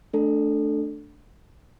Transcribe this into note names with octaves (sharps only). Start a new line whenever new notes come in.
A3 D4 A4